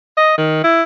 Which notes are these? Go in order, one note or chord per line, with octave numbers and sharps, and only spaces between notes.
D#5
D#3
E4